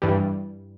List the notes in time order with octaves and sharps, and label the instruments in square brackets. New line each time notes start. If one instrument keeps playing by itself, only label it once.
[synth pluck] G2 E3 G3